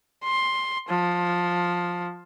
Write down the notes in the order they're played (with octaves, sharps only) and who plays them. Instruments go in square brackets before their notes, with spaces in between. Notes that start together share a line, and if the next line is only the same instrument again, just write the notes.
[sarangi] C6
F3